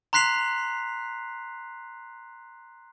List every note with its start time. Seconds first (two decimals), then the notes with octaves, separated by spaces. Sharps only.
0.13 A#5 C6 F#6 B6 C7 F7